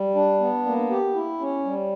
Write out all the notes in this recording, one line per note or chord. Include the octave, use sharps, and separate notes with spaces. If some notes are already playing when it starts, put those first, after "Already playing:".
Already playing: G3
D4
B3
A#3
G4
E4
C#4
G3